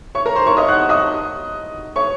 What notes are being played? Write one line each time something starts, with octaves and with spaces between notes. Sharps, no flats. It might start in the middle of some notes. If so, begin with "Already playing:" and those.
C#5 C#6
A#4 A#5
C5 C6
C#5 C#6
D#5 D#6
F#5 F#6
D#5 D#6
C#5 C#6